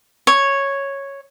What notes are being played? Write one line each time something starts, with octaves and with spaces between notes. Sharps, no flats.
C#5